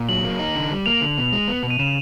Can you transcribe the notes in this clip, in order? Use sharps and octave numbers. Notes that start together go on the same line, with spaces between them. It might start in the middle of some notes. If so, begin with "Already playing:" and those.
Already playing: A#2
F#3 F#7
A#3
D#4
D3
G3
A#3 F7
D3
B2
G#3
B3
B2
D#7
C#3 E7